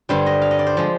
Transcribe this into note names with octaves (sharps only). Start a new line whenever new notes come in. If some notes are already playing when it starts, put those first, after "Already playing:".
G2 D3 G3 C5
D#5
F5
D#5
D5
C5
F3 G#3